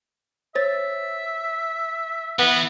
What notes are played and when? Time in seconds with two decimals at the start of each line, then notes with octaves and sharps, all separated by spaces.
0.55 C5 C#5 E5 A6
2.39 E3 B3